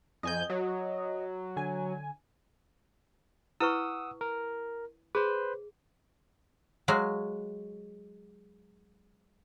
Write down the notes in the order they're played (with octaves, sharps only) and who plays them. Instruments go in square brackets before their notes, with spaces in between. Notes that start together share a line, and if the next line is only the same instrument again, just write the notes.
[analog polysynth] F2 G#5 G6 [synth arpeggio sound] D#5
[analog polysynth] F#3
[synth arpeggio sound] D3 G#5
[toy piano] E4 B4 C#6 [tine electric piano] F#5 D#6 E6
[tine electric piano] A#4
[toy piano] G#4 [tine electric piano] B4 C5
[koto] F#3 G#3 F5